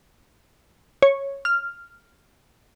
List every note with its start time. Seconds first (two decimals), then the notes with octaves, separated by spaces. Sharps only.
1.02 C#5
1.45 F6